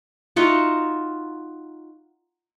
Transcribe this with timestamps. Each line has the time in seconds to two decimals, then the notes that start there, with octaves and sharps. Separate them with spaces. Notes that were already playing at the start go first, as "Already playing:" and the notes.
0.36 D#4 F4 F#4 E5